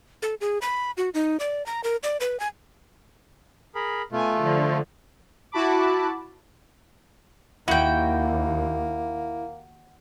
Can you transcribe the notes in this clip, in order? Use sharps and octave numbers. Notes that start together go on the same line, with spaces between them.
A4
G#4
B5
F#4
D#4
D5
A#5
A#4
D5
B4
G#5
G#4 A#4 B5
B2 A3 F4 G#5
D3 F3
E4 F#4 A5 B5 D6
D#2 A#3 E4 F#4 G5